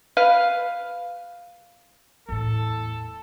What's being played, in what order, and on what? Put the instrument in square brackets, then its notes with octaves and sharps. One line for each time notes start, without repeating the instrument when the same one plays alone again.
[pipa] B4 F5
[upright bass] E2 A2 [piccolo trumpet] A4